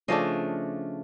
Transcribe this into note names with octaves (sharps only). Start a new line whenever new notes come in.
C#3 F3 A3 D4 D#5 F5